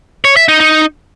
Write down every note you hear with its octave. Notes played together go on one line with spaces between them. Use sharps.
C#5
E5
D#4
D#4